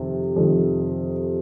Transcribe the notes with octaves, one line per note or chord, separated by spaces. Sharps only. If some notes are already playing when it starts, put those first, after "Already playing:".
Already playing: F2 C3 D#3
F2 C3 D#3